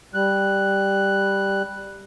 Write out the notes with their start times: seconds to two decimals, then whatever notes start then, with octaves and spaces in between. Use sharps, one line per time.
0.14 G3 F#6